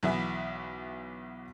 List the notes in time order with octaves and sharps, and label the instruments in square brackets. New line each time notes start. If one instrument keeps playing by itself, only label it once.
[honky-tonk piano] B1 E3 B3 E5